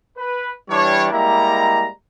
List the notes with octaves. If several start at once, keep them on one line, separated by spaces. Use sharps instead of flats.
B4
E3 G3 D4 C#5
G3 G#3 A#3 E4 A#5